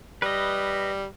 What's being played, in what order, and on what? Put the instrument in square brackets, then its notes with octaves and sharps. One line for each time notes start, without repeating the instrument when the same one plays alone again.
[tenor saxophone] G3 [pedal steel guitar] B4 D#5